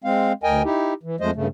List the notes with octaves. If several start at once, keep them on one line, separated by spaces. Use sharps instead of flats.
G#3 C4 F5
D2 A#4 D#5 G5 G#5
D#4 E4 G4
E3
F2 F3 G#3 A3 C5 D#5
G2 C#3 A3